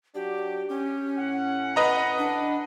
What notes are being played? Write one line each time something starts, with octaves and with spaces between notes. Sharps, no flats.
F#3 D4 F#4 G4
C#4 G4
A2 F#5
B4 D#5 A#5
D4